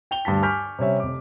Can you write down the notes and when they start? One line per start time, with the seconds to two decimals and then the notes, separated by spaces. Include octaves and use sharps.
0.11 G5 F7 G7
0.25 D2 G2 G3 A5 B6
0.42 G#5 C#6 D6 F6 G6 B6
0.79 C3 G3 C#4 E5
1.00 F1 D6